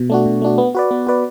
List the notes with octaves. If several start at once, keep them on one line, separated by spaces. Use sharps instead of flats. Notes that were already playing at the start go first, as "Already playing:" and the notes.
Already playing: B2
A3 D4 F#4
B2
A3 D4 F#4
B3
F#4 B4 D5
B3
F#4 B4 D5